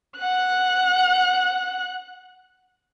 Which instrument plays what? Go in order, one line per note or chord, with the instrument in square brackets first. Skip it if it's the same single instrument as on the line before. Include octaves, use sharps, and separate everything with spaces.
[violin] F#5 F#6